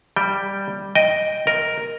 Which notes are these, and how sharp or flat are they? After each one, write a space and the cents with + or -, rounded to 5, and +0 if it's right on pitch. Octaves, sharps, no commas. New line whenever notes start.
G3 +0 G5 +0
D#5 +0 G5 +0
A#4 +0 D#5 +0